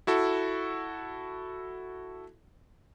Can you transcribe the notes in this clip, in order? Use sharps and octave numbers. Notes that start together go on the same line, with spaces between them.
E4 F#4 A4